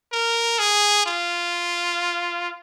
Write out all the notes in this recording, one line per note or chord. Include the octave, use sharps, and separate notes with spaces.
A#4
G#4
F4